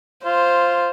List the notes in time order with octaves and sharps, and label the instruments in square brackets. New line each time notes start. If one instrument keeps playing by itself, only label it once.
[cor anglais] F4 [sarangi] C5